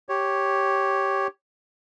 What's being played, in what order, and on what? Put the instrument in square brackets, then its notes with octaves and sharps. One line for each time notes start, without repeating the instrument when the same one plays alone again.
[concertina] G4 C#5